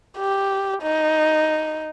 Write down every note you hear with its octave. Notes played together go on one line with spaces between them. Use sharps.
G4
D#4